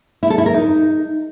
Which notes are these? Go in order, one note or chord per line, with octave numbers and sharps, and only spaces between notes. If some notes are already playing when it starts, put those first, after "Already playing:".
E4
A4
E4
A#4
D#4